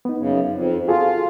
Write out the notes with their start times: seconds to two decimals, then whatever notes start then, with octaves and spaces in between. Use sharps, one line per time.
0.05 B3 D#4
0.17 F#2 C#3
0.52 F2
0.88 F4 F#4 G#4 A4